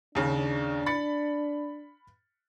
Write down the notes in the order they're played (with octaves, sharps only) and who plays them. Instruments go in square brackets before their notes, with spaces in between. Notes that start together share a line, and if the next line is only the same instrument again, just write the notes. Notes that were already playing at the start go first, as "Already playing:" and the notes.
[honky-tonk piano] D#2 C#3 [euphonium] D4
[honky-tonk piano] B5 A6 C#7